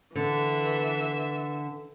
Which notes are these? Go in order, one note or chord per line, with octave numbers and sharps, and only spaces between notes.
D3 E3 E5